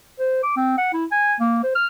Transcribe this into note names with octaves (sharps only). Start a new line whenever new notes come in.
C5
D6
C4
F#5
E4
G#5
A#3
C5
F6